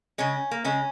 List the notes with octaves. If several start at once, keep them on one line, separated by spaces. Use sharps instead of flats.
C#3 G#3 C#4
A#3
C#3 G#3 C#4